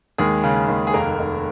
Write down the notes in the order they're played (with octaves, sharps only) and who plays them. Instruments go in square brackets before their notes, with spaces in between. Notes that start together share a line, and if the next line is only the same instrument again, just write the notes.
[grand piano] D#2 G#3 G#4
C#3
D#2
G#4
F1 A#3 A#4
F1